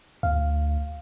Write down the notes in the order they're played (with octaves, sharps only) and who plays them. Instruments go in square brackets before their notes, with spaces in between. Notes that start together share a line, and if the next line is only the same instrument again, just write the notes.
[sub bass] D2 [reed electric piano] F5